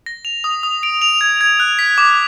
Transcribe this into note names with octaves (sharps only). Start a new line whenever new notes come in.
A#6
F7
D#6
D#6
D7
F7
G#6
G#6
F#6
B6
D6